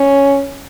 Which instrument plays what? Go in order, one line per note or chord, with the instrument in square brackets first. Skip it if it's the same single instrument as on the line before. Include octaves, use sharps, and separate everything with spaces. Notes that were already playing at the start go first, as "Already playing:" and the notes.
Already playing: [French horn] C#4